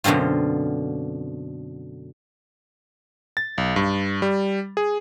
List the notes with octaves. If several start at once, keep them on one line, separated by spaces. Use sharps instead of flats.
F#2 B2 D3 C4 F4
A6
B1
G2
G3
G#4